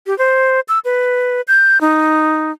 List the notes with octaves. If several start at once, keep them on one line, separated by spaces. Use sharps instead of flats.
G4
C5
E6
B4
G6
D#4